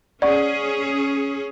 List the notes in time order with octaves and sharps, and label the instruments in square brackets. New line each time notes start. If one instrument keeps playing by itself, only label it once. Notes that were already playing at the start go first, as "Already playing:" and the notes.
[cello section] C#4 G#4 [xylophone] D5 F#5 C#6